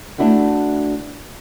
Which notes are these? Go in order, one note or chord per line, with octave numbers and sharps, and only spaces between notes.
A3 B3 D4 E4 F#4 F#5